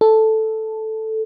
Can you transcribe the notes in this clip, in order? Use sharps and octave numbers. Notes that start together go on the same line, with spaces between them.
A4